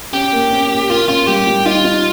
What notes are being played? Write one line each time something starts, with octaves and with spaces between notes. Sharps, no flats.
C#4 G4
A#3
C#4
A#2
A#3 F4
C#4 F4
G3 G4
G3
D#4 F4
D#4